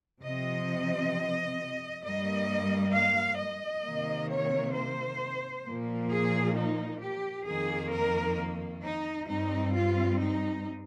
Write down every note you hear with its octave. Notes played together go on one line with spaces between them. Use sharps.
C3 F3 C4 D#5
G2 G3 A#3 D#5
F5
D#5
C3 D#3 A#3
C#5
C5
A#2 F3 A#3
G#4
D#4
G4
F2 D#3 A#3 G#4
A#4
D#4
G2 G3 C4 D#4
F4
D#4